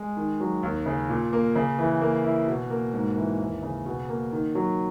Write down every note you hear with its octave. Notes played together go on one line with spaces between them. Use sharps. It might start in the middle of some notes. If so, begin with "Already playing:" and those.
Already playing: G#3
D#3
F#3
D#2
C#3
A#2
A#3
C#3
E3
A#3
E4
B2
A#3
G#2
E3
D#2
C#3
B2
A#3
D#3
F#3